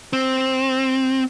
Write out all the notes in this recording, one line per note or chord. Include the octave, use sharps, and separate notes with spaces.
C4